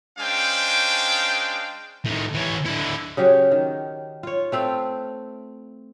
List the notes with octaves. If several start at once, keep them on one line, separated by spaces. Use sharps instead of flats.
G#3 C#4 D4 C5 F5 G5
A2 D#3
E3 C#5
D3 E4
C#3 F#3 G4 F5
D#3
F4 C#5
A3 C4 F5 G5